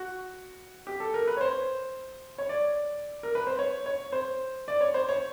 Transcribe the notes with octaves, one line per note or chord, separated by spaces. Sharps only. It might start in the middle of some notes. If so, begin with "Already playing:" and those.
Already playing: F#4
G4
A4
A#4
B4
C#5
C5
C#5
D5
A#4
B4
C5
C#5
C#5
C5
D5
C#5
C5
C#5